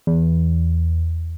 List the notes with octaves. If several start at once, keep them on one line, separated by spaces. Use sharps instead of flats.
E2